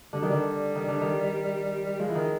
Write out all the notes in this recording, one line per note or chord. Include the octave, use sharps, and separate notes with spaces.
D3 G3
D#3 F#3
D3 G3
D#3
D3
D#3
F3 G#3
E3
D#3